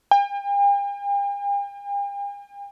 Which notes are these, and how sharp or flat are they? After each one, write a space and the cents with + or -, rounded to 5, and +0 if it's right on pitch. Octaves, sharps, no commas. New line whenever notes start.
G5 +45